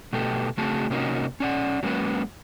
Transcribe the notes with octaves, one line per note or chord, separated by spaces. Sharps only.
B2 A3 B3 G4 A4
C#3 A3 C4 F#4 G#4 A5
C3 A#3 C#4 D#4 F#4 A#4
C#4 D5 F#5
F#3 G#3 A#3 C#4 F#4 B4